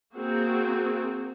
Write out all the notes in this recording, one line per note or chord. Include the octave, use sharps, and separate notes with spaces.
A#3 C4 F#4 G#4